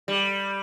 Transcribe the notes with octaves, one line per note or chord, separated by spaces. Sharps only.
G3